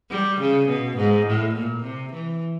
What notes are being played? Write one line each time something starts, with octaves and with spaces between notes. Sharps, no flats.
G3
C#3
B2
G#2
A2
A#2
C3
E3